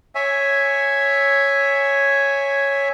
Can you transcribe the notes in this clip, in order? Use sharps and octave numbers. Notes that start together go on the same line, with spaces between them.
C#5 E5 G#5